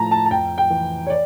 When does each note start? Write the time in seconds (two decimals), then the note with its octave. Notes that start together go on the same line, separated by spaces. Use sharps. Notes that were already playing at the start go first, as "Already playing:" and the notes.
Already playing: A2 F3 A5 A#5
0.11 A5
0.26 A5
0.31 F2 G5
0.58 G5
0.70 E3
1.07 C#5
1.10 D5